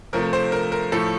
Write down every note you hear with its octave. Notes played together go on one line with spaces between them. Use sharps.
C3 F3 A3 A#4
C5
A#4
A#4
A2 F3 A3 A4